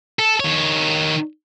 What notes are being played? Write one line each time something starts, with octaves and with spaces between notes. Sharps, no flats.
A4
D#3 C#5